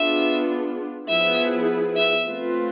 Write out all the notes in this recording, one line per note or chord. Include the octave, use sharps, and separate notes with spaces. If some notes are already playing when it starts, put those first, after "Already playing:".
Already playing: B3 D4 F4 G#4 E5
F3 B3 E4 G#4 B4 E5
E5
A3 C4 F4 B4